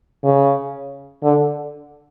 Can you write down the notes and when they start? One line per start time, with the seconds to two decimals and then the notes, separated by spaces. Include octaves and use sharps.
0.24 C#3
1.23 D3